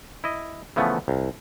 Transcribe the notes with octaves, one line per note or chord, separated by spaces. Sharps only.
E4 D#5
C#3 E3 F3 A3 B3
C2